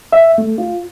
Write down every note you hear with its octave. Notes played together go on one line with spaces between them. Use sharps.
E5
A3
F4